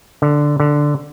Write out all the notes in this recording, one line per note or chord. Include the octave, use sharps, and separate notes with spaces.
D3
D3